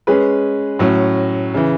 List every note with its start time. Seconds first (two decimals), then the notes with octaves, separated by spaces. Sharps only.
0.07 G#3 C#4 G#4 B4
0.79 A2 F#3 C#4
1.54 C#3 E3